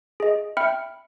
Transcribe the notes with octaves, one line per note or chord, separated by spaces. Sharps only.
G#4 D#5
E5 G5 B5 F6 C#7